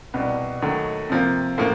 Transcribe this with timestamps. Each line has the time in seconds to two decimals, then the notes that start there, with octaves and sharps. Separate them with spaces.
0.14 C2 B2 G3 B3
0.62 D#2 D#3 F#3 A3
1.10 C3 F3 A#3
1.58 A2 F3 A#3